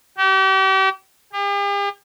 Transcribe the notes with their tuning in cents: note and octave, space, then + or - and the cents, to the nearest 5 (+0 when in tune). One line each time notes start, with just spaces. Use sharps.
G4 -40
G4 +45